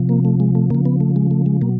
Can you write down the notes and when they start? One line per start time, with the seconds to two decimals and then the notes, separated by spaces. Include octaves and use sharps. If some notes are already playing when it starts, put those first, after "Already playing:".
Already playing: C3 F3
0.09 A#3
0.25 A3
0.40 G#3
0.55 A3
0.70 C#3 F3 A#3
0.86 B3
1.01 A3
1.16 G#3
1.31 A3
1.46 G#3
1.61 B2 F#3 A#3